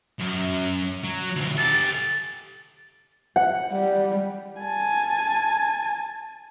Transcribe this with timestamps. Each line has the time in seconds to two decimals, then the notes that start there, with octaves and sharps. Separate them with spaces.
0.19 F#2 F#3
1.04 F#3
1.36 D2 B2
1.58 G4 A4 A6
3.36 F#5
3.72 G3
4.62 G#5 A5